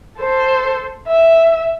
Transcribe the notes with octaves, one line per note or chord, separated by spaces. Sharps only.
A4 C5
E5